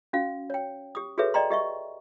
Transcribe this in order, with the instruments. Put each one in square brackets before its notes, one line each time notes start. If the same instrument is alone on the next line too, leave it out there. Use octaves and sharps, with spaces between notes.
[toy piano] C#4 F#4 F5
C#5 G5
G4 D#6
F#4 G#4 A4 B4 C#5 E5
D5 D#5 G5 A#5 C6
G4 D#5 E5 C#6